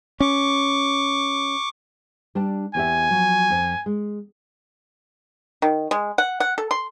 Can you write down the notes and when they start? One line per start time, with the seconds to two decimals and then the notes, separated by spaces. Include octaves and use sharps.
0.20 C#4 C#6 D6
2.35 G3 D4 A5
2.75 E2 G4 E5 G#5
3.11 F3 F#3
3.50 F2
3.86 G#3
5.62 D#3
5.91 G#3
6.18 F#5
6.40 F#5
6.58 A4
6.71 C6